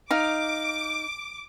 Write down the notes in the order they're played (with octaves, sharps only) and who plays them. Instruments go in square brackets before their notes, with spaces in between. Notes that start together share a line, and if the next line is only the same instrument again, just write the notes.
[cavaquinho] D#4 F5 [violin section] D6